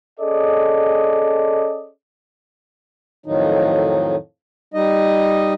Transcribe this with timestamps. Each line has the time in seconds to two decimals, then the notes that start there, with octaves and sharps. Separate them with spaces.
0.20 C#4 G#4 A4 D5 D#5
3.26 F2 A2 D#3 F#3 D#4
4.74 G3 D#4 D#5